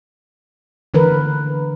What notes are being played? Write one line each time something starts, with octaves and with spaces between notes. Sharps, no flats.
D3 E3 A#4 B4